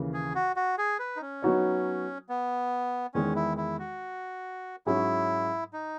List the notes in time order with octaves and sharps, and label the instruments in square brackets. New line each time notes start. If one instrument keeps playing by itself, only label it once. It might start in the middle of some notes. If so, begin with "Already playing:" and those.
Already playing: [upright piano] D#2 C#3 E3
[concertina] G#4
F#4
F#4
G#4
B4
D#4
C#4
[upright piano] F#3 B3 D#4 F#4 C#5
[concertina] B3
[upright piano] E2 D#3 G#3 [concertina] C#4
[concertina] E4
E4
F#4
[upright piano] G#2 F#3 C#4 G#4 [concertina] E4
[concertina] D#4